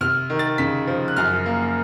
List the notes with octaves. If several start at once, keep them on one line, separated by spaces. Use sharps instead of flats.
C3 F6
D#3
A6
C#3 B6
F3
F#6
F#2 F6
A#3